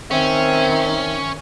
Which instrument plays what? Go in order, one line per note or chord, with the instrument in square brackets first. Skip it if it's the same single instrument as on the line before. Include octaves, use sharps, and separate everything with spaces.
[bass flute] D#3 [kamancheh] C4 E5 [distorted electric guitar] C#4